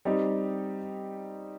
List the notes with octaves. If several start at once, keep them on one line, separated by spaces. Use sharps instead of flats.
G3 C4 D#4 G4